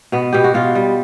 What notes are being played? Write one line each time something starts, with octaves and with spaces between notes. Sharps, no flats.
B2 B3
B2 G4
F#4
B2 F4
G3